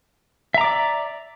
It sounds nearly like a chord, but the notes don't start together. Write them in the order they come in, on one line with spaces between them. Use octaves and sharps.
E5 A#5 D6 D5